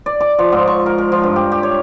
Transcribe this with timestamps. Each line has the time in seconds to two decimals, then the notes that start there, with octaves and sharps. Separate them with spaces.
0.06 D5
0.20 D6
0.39 F3
0.52 G#2
0.67 C#6
0.86 A#4
0.98 A#4
1.12 F3
1.23 G2
1.36 G4
1.52 G4
1.63 C#5